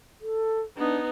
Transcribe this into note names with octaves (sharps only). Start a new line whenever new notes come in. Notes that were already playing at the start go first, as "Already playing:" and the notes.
A4
B3 D4 D#4